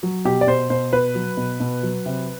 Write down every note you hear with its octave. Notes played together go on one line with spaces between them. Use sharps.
F#3
B2 G4
D5
B2 C5
B2 C5
B2 B4
F#3
B2
B2
F#3
C3